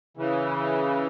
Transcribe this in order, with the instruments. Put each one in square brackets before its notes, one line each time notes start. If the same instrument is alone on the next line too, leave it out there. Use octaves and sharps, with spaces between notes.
[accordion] C#3 E3